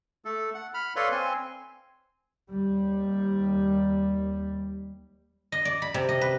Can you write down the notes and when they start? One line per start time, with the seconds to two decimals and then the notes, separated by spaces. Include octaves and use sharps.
0.25 A3 A4
0.54 F#5
0.74 B5 F6
0.96 A4 B4 C#5 D5 F5 C6
1.12 C4 G#5 C6
2.50 D#2 G3
5.52 D#5
5.65 D5
5.82 B5
5.94 C3
6.09 D#5
6.21 B4